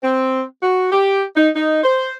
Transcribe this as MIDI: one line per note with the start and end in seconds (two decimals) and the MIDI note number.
0.03 0.43 60
0.61 0.88 66
0.92 1.23 67
1.36 1.49 63
1.55 1.79 63
1.83 2.15 72